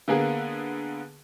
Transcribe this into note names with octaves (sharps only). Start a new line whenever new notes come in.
D3 A#3 B3 G#4